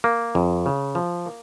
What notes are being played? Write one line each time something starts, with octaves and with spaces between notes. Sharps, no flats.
A#3
F2
C#3
F3
A#3